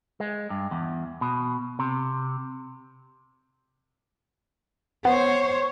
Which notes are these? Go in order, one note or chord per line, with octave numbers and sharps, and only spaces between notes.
G#3
G2
E2
B2
C3
B3 C5 C#5